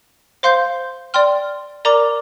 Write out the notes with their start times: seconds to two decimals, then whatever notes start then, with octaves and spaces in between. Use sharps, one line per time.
0.43 C5 F5 C6 G6
1.14 D5 G5 C6 F6
1.85 A#4 D5 A#5 D6